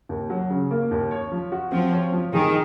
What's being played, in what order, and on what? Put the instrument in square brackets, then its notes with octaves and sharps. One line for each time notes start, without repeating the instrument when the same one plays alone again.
[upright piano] D#2
F#3
C#3
A#3
D#2
C#5
F3
F#4
[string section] F3 [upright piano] C4
[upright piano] C#5
F3
[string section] D#3 [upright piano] G#4